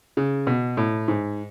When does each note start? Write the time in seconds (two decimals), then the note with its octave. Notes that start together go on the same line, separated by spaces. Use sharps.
0.17 C#3
0.47 B2
0.77 A2
1.08 G#2